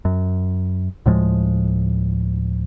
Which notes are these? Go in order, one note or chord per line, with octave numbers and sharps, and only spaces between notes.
F#2
D2 A2 F3 G#3